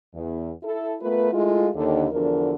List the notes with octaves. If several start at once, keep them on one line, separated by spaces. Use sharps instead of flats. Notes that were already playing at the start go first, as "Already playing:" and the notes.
E2
E4 A4
A3 B3 F4 A#4 B4
G#3 A3 E4 F4
D#2 D3
E2 D3 F3 D4 F#4 A#4